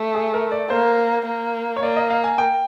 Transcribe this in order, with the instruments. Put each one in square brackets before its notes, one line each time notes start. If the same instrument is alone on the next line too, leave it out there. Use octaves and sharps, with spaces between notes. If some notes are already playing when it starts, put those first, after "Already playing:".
Already playing: [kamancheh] A3
[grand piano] G#4
A#4
D5
[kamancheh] A#3 [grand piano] C5
[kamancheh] A#3
[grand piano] C#5
[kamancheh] A#3 [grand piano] D5
[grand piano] D#5
F5
G#5
G5